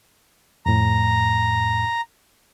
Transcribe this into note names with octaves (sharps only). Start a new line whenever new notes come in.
F2 A2 A#5